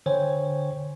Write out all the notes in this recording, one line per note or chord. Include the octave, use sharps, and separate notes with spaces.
D3 C5 C#5 G5 G#5